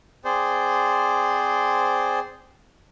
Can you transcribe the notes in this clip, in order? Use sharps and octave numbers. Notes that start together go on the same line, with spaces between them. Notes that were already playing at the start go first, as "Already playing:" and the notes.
C4 G#4 C5 D5